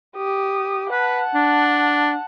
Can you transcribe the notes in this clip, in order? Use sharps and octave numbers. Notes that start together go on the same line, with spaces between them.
G4 D#6
B4 F#5 A5
D4